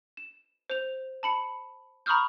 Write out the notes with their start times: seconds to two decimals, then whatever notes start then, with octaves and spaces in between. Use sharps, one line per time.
0.17 E7
0.70 C5 F7
1.23 A5 B5 C#7
2.06 A#5 B5 C#6 D#6 F6 G6